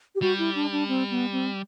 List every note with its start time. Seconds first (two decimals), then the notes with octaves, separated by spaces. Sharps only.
0.15 G4
0.21 G3 F#4
0.38 E4
0.55 D4
0.72 D4
0.88 C4
1.10 B3
1.32 C4